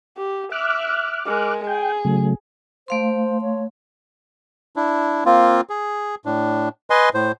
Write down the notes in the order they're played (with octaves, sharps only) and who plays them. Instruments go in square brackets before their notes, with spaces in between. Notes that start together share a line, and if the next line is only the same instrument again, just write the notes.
[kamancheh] G4
[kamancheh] E5 [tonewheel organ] D6 F6 F#6
[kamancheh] G#3 A#4
[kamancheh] G#4 [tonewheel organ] G5
[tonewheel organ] C#3 F#3 A3
[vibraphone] A3 F5 C6 [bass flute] C5
[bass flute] C#5
[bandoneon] D4 E4
A#3 C4 F4
G#4
A2 D4
B4 D#5 G#5 C6
A2 C5